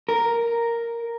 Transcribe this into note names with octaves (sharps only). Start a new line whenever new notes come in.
A#4